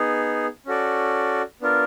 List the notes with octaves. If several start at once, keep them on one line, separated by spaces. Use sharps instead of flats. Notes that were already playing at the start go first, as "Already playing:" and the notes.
Already playing: B3 D#4 G#4
C#4 F#4 A4 D5
B3 D4 F4 A#4